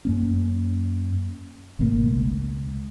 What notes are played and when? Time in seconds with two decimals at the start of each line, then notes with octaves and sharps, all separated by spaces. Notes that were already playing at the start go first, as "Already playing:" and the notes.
0.05 F#2 A#3 C#4
1.79 G#1 B2 A3 A#3
2.07 C#2